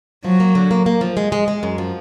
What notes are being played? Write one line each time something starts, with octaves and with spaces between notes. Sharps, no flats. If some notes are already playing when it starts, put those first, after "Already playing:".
F3 F#3
A#3
D3
A#3
A#3
F3
G#3
G#3
G#3
F#2
F3